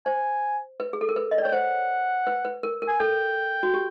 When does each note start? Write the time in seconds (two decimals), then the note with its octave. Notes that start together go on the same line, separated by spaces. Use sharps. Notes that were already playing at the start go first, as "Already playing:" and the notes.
0.06 C5 G#5
0.80 B4
0.93 G#4
1.01 A4
1.09 A#4
1.16 B4
1.31 D#5
1.38 D5
1.43 C#5 G5
1.52 C5 F#5
2.27 B4
2.45 B4
2.63 A#4
2.82 A#4
2.88 G#5
3.00 A4 G5
3.63 F#4
3.74 G4